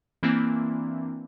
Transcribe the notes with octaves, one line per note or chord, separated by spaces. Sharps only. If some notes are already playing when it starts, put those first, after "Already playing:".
E3 A#3 C4 D4 E4